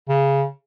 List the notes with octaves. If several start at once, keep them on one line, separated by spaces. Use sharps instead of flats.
C#3